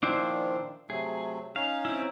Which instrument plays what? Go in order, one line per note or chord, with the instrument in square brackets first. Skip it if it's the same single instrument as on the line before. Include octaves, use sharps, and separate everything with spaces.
[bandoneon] A#2 D#3 F3 [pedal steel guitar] D4 E4 C5
[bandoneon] C3 F#3 A3 [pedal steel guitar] G#4
[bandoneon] C#4 D#4 C#5 [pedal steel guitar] F5
[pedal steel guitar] C4 E4